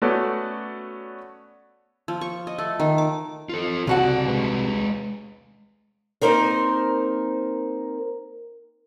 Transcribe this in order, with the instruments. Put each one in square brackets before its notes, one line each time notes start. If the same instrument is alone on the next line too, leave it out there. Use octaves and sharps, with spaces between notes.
[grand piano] A3 B3 C#4 F#4 A4 D5
[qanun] F3
C#6
D#5
A3
D#3
D6
[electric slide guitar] F4 A4
[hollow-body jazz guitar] C2 F#4 F#5 [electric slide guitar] C#3 A5
[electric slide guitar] G#3 G#4 B4
[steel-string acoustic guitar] A#3 C4 D#4 A#4 C5